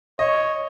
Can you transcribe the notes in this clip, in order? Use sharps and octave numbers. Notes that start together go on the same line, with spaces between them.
C#5 D#5